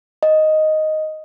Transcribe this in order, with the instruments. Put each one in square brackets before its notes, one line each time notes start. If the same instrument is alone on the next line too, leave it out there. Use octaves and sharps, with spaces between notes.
[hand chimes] D#5